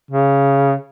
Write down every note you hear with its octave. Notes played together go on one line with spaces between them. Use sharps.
C#3